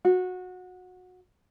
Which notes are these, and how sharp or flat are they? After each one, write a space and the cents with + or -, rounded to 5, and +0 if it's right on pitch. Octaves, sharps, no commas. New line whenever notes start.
F#4 -20